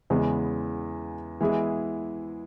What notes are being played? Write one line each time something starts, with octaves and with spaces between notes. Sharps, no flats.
E2 C#3 G#3 B3
E3 G#3 B3 E4 G#4